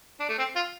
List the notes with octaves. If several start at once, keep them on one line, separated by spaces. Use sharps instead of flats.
D4
A3
C4
F4